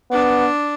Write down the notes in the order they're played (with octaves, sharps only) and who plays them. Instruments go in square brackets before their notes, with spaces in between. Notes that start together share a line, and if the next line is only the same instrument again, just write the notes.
[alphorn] B3 [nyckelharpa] D4